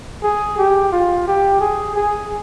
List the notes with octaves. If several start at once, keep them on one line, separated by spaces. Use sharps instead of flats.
G#4
G4
F4
G4
G#4
G#4